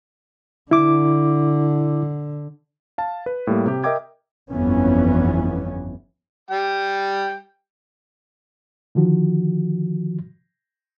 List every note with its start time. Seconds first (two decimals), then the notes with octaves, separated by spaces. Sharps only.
0.71 D3 E4 D6
2.98 F5 A5
3.26 B4
3.47 A2 G3 A#3
3.66 C3 G4
3.84 A#4 D#5 E5 G5 D6 G#6
4.50 G1 F2 E3 B3 C#4
6.51 G3 G5
8.95 D3 D#3 F3 F#4